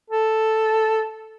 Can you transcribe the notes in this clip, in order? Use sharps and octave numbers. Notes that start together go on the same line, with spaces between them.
A4